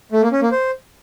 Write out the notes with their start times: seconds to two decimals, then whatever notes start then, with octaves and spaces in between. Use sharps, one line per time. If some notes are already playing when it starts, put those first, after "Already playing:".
0.12 A3
0.22 A#3
0.32 C#4
0.42 A#3
0.51 C5